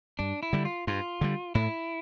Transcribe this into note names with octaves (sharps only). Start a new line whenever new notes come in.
G2 D4
E4
D3 G3
F4
G2 F4
D3 G3
A2 E4